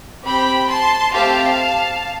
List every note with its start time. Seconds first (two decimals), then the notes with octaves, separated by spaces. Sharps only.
0.25 C4 G4 G5 B5
0.70 A5 C6
1.13 A3 C4 G4 F5 A5